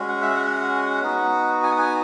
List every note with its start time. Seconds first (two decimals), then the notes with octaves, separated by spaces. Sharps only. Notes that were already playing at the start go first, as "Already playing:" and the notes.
Already playing: G#3 C#4 F#4
0.08 F#5
0.22 E5
0.36 F#5
1.02 B3 D#4 F#4
1.63 G#5
1.71 F#5
1.79 G#5